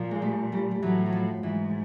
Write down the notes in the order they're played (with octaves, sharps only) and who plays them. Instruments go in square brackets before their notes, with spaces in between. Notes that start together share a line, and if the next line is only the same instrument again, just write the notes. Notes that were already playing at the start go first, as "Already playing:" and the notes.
Already playing: [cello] A#2 [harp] F3
[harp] G#3
G3 A3
G3 A3
G3
[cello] A2 [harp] E3 F#3
[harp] F#3
F3
[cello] G#2 [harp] E3